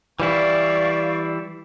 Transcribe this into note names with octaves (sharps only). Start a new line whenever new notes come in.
E3 G3 E4 D5 F5 C#6